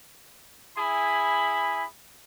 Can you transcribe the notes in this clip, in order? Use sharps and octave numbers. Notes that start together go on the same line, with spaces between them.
E4 G#4 G#5 B5